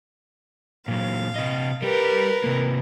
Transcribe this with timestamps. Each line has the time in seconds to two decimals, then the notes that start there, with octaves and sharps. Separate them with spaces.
0.88 A#2 F#3 F5
1.36 C3 D#5
1.82 G3 G4 A#4 B4
2.44 C3 A#3